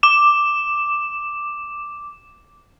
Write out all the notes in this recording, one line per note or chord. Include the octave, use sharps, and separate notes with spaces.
D6 E7